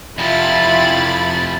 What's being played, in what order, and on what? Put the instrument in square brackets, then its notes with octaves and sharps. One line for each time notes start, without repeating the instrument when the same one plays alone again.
[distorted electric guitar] F2 C3 [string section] E4 F4 [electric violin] B5 A6